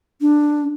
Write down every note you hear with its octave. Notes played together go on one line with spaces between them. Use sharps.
D4